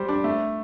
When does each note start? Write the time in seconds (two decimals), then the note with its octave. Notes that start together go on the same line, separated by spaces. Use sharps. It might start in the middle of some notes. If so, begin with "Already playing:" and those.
Already playing: G3 G4 C5
0.08 D4
0.24 A3